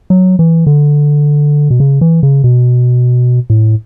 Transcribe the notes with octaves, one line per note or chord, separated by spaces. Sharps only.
F#3
E3
D3
B2
C#3
E3
C#3
B2
A2